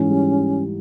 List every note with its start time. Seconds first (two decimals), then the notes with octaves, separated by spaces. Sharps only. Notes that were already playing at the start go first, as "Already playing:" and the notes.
Already playing: G#2 E3 C#4
0.09 G3